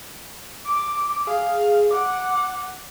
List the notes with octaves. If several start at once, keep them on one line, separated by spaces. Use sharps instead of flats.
D6
G#4 F5
F#5 D6